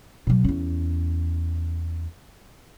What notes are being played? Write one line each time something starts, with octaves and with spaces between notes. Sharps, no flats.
B2 F#3
E2 C#4